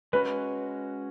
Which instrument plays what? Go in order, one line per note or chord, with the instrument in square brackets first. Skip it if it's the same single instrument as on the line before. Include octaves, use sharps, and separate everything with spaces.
[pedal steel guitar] G#3 C#4 F#4 [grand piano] B4